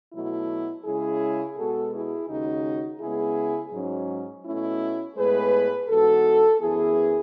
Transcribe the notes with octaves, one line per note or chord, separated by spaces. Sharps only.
B2 F#3 A3 E4
C#3 G#3 C#4 E4 G#4
B2 G#3 B3 F#4 A4
E4 G#4
D#2 C#3 G#3 C#4 D#4 F#4
C#3 G#3 B3 E4 G#4
G#2 F#3 C#4
B2 A3 C#4 E4
A2 G#3 B3 G#4 B4
G#2 E3 B3 F#4 A4
F#2 E3 B3 E4 G#4